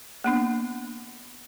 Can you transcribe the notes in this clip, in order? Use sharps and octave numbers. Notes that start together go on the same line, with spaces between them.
A#3 B3 D4